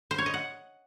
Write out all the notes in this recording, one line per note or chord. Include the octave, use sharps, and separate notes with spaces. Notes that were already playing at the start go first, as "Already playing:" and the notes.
C5
C#5
D#5
F#5